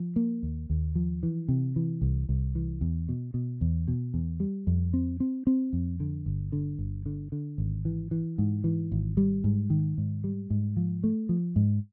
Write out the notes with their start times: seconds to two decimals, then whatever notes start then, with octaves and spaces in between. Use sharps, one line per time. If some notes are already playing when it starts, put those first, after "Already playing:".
Already playing: F3
0.16 A#3
0.43 D#2
0.70 D#2
0.95 F3
1.23 E3
1.48 C3
1.76 E3
2.01 C2
2.29 C2
2.55 E3
2.81 E2
3.09 B2
3.34 B2
3.61 E2
3.88 B2
4.14 E2
4.40 G3
4.67 F2
4.93 C4
5.20 C4
5.47 C4
5.73 F2
6.00 D3
6.26 G1
6.52 D3
6.79 G1
7.06 D3
7.32 D3
7.58 G#1
7.85 E3
8.11 E3
8.38 G#2
8.64 E3
8.92 G#1
9.17 G3
9.44 G#2
9.70 D#3
9.98 G#2
10.24 G3
10.50 G#2
10.77 F3
11.04 A3
11.29 F3
11.56 G#2